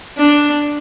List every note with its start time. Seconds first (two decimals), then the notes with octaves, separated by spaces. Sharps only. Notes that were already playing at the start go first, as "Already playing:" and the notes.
0.18 D4